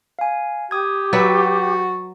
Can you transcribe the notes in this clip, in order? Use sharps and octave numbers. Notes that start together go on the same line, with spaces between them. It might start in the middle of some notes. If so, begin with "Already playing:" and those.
F5 G#5
G4 D#6 G#6
F#3 F#4 B4 E5 A6